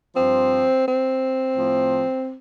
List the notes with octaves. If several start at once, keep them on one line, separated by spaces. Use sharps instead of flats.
G2 F3 C4
C4
A2 F3